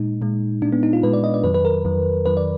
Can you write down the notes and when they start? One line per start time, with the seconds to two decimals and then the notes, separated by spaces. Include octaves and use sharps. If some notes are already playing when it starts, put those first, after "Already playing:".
Already playing: A#2 G#3 D#4
0.22 A#2 G#3
0.62 A#2 G#3 D4
0.72 B3
0.83 D#4
0.93 F4
1.03 A#2 G#3 B4
1.13 D5
1.24 D#5
1.34 D5
1.44 F2 D#3 F#3 B4
1.54 B4
1.65 A#4
1.85 F2 D#3 F#3
2.26 F2 D#3 F#3 B4
2.37 D5